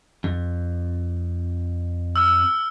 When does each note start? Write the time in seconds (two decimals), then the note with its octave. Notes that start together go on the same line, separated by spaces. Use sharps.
0.24 F2
2.16 E6 F6